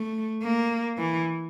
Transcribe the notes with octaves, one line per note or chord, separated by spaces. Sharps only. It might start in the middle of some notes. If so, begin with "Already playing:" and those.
Already playing: A3
A#3
E3